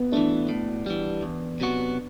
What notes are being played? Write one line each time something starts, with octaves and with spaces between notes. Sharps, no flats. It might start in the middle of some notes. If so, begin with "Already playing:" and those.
Already playing: B3
E3 A3 D4
A2
E3 G3
E2
C3 F#3 B3 F#4